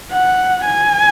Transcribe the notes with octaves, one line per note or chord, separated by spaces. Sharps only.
F#5
G#5